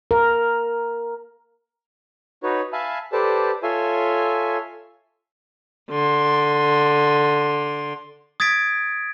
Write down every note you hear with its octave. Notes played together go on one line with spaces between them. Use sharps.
A#4
D#4 F#4 B4 C#5
E5 F5 G#5 A5 B5
G4 A4 B4 C5 D5 A5
F4 A4 C#5 E5 G#5 C6
D3 C6
D#6 G#6 A6 B6 D7